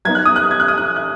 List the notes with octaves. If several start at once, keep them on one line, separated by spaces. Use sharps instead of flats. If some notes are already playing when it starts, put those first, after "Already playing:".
F#3 B3 D#4 G#6
F#6
D#6
F#6
G#6
F#6
D#6
F#6
F#6